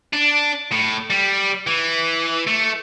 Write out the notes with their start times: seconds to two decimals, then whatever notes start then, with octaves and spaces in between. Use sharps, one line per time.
0.13 D4
0.72 A2
1.10 G3
1.67 E3
2.47 A3